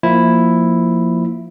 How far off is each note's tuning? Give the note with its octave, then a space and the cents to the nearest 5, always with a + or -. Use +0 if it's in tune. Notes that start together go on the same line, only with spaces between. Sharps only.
F3 +0 A#3 +0 E4 +0